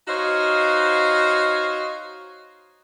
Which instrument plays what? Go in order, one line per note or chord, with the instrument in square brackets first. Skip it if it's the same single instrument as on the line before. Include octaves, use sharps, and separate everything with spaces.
[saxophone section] D#4 F#4 C5 C#5 D#5 F5